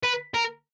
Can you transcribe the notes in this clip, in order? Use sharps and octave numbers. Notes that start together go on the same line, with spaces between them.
B4
A#4